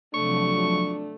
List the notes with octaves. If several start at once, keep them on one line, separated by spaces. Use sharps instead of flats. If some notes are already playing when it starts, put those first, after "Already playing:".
C3 F3 F#3 A3 D4 C#6